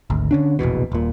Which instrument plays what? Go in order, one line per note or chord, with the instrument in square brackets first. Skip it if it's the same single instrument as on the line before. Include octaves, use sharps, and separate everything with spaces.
[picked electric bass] G#1 D2
D3 C#4 D4
F1 A#1 E2 B2
D#1 A#2